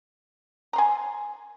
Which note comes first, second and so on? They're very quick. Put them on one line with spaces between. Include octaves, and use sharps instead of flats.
A#5 C6 G#5